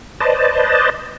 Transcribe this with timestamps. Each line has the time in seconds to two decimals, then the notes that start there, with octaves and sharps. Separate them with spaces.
0.20 B4 C5 D5 D#5 A5